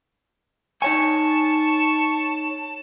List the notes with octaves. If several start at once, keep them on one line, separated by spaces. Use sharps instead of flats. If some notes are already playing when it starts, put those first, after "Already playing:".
D#4 C#5 G#5 A5 C#6